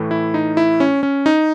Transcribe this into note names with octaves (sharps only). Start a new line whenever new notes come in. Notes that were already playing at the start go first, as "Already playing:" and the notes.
Already playing: A2 E3 A3
E4
D#4
E4
C#4
C#4
D#4